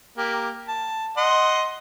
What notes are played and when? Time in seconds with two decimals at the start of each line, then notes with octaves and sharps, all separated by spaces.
0.18 A#3 G4
0.68 A5
1.17 D#5 F#5 C6